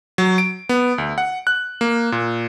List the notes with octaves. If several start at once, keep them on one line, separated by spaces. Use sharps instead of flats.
F#3
D7
B3
D2
F#5
F#6
A#3
A#2